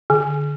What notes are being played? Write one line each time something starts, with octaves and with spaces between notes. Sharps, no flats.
D3